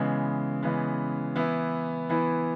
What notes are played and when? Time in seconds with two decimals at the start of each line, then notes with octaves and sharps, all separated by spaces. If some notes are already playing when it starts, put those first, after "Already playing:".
Already playing: C#3 E3 G#3 B3
0.63 C#3 E3 G#3 B3
1.36 E3 B3 E4
2.10 E3 B3 E4